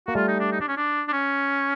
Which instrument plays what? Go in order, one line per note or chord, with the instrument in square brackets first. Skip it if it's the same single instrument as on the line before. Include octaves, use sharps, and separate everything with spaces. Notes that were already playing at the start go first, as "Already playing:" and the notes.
[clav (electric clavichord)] A#3 [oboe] F#4
[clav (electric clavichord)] G3 A3 [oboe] F4
[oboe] D#4
D4
D#4
D4
C#4
D4
D4
C#4